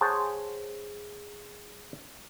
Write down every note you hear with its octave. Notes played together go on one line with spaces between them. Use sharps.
G#4 C5 C#5 F#5 G#5 A5